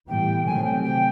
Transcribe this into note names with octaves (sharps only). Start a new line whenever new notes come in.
A2 E3 G3 B3 G5
C3 D#3 F#3 A3 C4 G#5
G5
G5